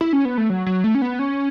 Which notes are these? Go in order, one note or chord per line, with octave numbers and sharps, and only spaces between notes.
E4
C#4
B3
A3
F#3
F#3
A3
C#4
B3
C#4